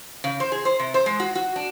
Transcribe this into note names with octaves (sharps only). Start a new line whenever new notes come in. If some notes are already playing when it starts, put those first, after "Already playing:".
C#3
C5
G#4
C5
C3
C5
G#3
F#4
F#4
D4